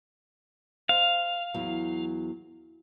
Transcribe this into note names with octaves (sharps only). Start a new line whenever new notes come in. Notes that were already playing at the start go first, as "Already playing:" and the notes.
C5 F5
E2 F#3